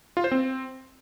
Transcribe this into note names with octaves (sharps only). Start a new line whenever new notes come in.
F4
C5
C4